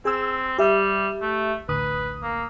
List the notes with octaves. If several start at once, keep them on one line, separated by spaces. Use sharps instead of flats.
C4 G#4 E6
G3 G4 E5
A3
A1 D2 B4 D#6
A#3